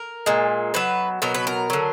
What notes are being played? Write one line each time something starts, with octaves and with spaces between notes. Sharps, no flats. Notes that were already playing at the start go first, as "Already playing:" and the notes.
Already playing: A#4
A#2 G#3
B2 F#3 B4
B2 F#3 A#4
B4
A#4
D3 F#3